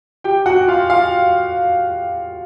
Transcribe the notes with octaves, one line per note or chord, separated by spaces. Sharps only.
G4 G5
F#4 F#5
F4 F5
F4 F5